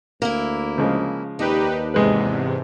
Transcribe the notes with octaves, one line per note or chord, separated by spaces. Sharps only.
D2 A#3 E4
C#3 F3 G#3
D#2 D4 D#4 G4 B4
E2 G#2 C3 G#3 B4